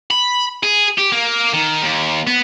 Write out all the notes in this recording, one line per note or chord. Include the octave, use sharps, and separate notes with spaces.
B5
G#4
G4
A#3
D#3
D#2
B3